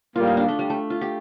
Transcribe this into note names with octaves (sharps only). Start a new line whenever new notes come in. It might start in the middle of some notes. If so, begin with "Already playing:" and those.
A2 G3 A#3 F4
D#4
D4
A3
G3
A3
F4
G4